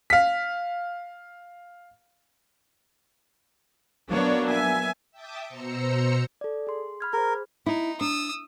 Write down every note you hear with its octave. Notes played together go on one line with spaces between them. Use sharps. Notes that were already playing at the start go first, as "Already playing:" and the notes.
F5 B6
F#3 A#3 B3 D4 C#5 D5
E5 G#5
E5 G5 A5 D6 D#6
B2 C5 A#5 E6 C#7
A4 D5
G#4 C6
B5 F6 G#6
G#4 A#4 C5
D#4 E4
D4 D#6 E6